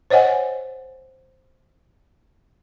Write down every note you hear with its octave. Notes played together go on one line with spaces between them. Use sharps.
C5 C#5 D#5 F#5 G#5